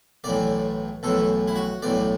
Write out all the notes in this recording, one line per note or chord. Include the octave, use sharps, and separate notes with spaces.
B1 A2 E3 D5
B1 A2 E3 A4
E4
F#4
B1 A2 E3 D5